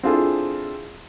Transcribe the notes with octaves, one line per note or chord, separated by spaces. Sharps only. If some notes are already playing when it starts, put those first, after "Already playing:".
C4 D4 E4 F4 G#4 A4